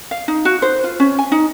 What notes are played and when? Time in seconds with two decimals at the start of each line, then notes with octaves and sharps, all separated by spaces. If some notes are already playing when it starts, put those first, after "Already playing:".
0.11 F5
0.28 D#4
0.45 F#4
0.62 C5
0.84 F4
1.00 C#4
1.19 G#5
1.32 D#4